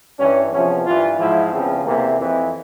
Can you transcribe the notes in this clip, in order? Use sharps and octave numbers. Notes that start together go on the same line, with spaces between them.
G2 E3 C#4
E2 C3 F3 C#4
G2 E3 F4
G#2 F3 E4
E2 C#3 F3 C4
E2 C3 E3 A#3
F2 E3 C4